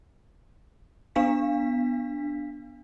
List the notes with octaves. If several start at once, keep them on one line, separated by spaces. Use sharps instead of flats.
B3 D4 F5 B6